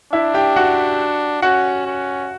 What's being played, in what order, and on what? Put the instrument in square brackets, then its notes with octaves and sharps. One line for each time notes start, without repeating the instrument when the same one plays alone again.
[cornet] D4 [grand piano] E4 E5
[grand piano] G4 G5
F#4 F#5
[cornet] C#4 [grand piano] F#4 F#5
[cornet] C#4